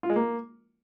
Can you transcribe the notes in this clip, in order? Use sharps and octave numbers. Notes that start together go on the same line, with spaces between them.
F4
G#3
A#3